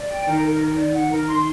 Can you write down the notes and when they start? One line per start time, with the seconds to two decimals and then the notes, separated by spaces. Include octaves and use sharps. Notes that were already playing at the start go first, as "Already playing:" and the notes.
Already playing: D5
0.10 G5
0.27 D#3 A#4
0.43 A#4
0.61 A#4
0.77 D5
0.94 F#5
1.11 A#4
1.27 C6